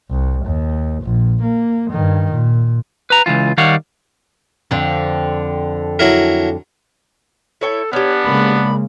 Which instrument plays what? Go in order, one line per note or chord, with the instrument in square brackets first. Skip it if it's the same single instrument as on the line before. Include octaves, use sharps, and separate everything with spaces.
[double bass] C2
D#2
A#1
A#3
G2 D#3
A#2
[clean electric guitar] B4 A#5
C#2 F#2 E3 F4
D#3 G3 C#5 F5 F#5
[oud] F2 D3 C4
[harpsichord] F#3 E4 A#4
[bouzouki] E4 C#5 G5 [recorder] A4
[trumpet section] B3 D4 [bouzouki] C#4 G4 [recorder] C#5
[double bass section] C#3 G#3 A#3 [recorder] B5